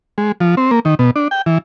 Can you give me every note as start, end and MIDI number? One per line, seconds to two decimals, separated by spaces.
0.18 0.32 56
0.40 0.55 53
0.57 0.71 60
0.71 0.80 58
0.85 0.95 51
0.99 1.11 47
1.16 1.28 62
1.31 1.42 79
1.46 1.58 52